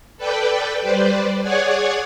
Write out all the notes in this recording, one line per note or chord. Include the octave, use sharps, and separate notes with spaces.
A4 B4 D5 G5
G3 B4 C5 D5
G#4 C#5 D5 F#5 G#5